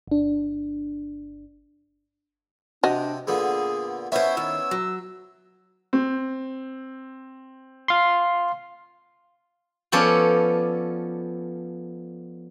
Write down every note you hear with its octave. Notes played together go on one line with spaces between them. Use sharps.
G1 D4
C3 D4 F#4 D#5
A#2 D3 B3 G#4
B3 C#4 E4 C5 E5
D#3 E6
F#3
C4
F5 C6
F3 B3 C#4 A4 C#5 D5